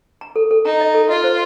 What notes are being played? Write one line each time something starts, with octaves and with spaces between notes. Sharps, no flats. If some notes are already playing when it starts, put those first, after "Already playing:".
A#5
A4
A4
D#4 A#5
D#5
A4
F4 D#5
C5